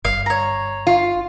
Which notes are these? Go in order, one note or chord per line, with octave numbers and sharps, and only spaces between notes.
G1 F5
C#5 A#5
F4